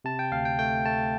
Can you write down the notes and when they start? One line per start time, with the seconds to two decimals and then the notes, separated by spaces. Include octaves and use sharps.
0.04 C3 A5
0.19 G5
0.32 D2 F5
0.45 G5
0.59 A3 G5
0.85 A3 A5